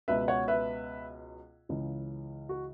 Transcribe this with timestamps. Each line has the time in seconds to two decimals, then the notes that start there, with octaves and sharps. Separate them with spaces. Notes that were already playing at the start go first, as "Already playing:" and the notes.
0.08 C#2 B2 B4 E5
0.28 C#5 F#5
0.48 B4 E5
1.69 C#2 C#3 E3
2.49 F#4